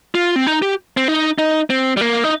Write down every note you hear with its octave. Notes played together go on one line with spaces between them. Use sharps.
F4
C4
D#4
G4
C4
D#4
D#4
C4
G3
A#3
D#4